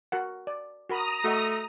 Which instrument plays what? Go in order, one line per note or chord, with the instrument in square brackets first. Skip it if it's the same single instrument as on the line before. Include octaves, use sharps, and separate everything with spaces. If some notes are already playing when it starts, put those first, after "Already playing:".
[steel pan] F#4 A#4 F#5
D5
[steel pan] F#4 A#4 B5 [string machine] A#5 D#6
[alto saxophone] A3 [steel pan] F#4 D#5